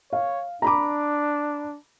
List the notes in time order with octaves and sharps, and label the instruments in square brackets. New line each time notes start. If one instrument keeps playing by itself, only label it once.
[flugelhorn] C#5 [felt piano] F5
[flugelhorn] D4 [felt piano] A#5 B5 D6